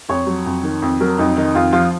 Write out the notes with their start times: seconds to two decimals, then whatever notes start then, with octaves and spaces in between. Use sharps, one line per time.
0.09 F2 C#5
0.27 F#3
0.46 F2
0.63 D#3
0.82 F2
1.00 F#3 A#4
1.18 F2 D#4
1.37 D#3 D#4
1.55 F2 F4
1.73 F3 F4